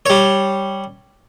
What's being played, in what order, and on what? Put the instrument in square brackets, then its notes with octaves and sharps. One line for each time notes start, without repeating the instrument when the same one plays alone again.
[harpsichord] G3 C#5